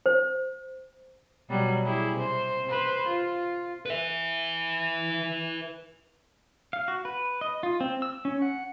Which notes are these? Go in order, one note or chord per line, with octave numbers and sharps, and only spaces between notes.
C5
B2 F#3 G3
E4 G4 G#4
C3 C5
B4 C5
F4
B4 E5
F5
F#4
B4
D#5
F4
C4
E6
C#4
F#5